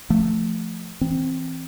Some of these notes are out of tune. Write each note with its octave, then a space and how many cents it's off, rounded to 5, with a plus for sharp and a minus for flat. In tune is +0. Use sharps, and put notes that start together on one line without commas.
F3 -10 A3 +0
E3 -10 C4 +0